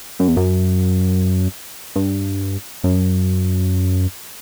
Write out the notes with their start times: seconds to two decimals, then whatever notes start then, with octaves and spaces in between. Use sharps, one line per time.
0.20 F#2
0.28 E2
0.36 F#2
1.96 G2
2.84 F#2